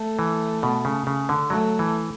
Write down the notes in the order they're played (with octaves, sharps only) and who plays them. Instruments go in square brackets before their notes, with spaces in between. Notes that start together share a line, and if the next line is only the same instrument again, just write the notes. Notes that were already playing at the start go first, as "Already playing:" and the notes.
Already playing: [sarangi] A3
[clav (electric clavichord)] E3
B2
C#3
C#3
D3
[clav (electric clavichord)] F#3 [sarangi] A3
[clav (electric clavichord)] E3